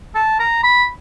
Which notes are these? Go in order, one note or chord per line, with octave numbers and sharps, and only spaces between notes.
A5
A#5
B5